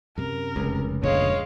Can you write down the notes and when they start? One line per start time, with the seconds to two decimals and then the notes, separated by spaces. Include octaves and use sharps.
0.18 F#2 C3 A#4
0.56 F1 C#2
1.03 F2 A#2 D3 G#3 C#5 F5